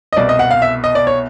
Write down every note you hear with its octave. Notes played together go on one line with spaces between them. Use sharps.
D#5
C2 B2 D5
D#5
F#5
F5
E5
D#5
D5
C#5